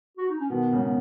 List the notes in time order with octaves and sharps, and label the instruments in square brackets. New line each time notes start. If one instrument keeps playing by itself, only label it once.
[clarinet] F#4
D#4
C#4
[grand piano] B2 D#3 [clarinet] B3
[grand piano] G#2 C#3
[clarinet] B3